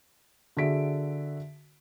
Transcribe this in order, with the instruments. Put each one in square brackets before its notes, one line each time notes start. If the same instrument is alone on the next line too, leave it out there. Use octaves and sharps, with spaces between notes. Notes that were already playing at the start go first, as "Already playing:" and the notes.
[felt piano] D3 F#4 G#4 E5 B6 D7